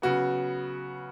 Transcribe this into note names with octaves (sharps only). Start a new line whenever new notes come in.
C#3 F#3 B3 F#4